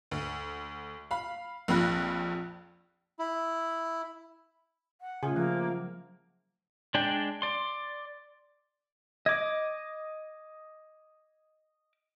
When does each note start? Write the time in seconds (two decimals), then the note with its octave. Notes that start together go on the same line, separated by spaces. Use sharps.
0.11 D2
1.11 F5 B5
1.68 A#1 F2 F4 B5 F#6 A#6
3.19 E4
5.01 F#5
5.23 C#3 A3 F4 G#4 E5
5.36 F3 A#3
5.71 F#3
6.94 G#3 D4 D5 G5
7.42 D5 C6
9.26 D#5 D6 G#6